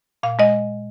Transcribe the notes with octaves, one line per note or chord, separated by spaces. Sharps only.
A#2 F5
G#3 D#5